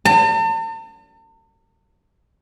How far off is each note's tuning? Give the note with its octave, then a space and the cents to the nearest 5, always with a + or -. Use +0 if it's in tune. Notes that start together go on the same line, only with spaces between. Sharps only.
A5 +45